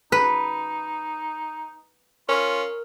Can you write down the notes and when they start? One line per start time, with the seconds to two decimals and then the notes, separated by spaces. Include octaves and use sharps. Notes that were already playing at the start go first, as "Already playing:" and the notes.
0.12 D#4 B4
2.29 C#4 F4 A#4 F6